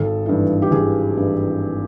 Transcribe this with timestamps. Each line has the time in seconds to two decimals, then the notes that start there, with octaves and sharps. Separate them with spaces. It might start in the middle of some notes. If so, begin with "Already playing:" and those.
Already playing: G#1 A4
0.26 G2 E3
0.62 G4
0.71 G#1 G#4
1.17 G2 E3